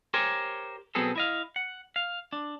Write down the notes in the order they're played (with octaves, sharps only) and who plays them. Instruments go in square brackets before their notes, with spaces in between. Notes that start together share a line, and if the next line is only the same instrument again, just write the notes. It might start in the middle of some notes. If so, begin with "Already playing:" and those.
[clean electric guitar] G4 A#4 C5 C#5 G#5
B2 F#3 B3 C4 G#4 A4
E4 D#5 F5
F#5
F5
D4